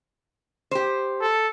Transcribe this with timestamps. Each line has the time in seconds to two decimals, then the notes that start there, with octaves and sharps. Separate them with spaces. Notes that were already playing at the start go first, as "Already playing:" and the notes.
0.71 G4 C5
1.21 A4